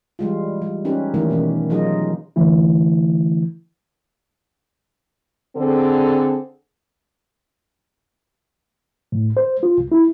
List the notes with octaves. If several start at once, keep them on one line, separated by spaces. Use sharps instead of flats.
E3 G3 G#3 F4
G3
C#4 D#4 G4 B4
D#3 E3 A3 A#3 E4
B2 E3 B3 C#4
F#3 D#4 F4 G#4 D#5
D3 E3 A3 E4
D3 C4 G#4 A4
A2
C5
F4
C2
E4